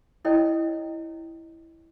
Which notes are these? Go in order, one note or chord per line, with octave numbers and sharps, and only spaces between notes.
E4 A4 C#5 D#5 G5